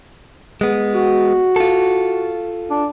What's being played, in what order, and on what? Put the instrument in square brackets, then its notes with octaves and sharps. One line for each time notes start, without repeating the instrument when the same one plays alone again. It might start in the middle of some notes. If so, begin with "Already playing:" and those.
[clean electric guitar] G#3 B3
[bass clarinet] F#4
[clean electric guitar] F4 A4
[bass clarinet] D4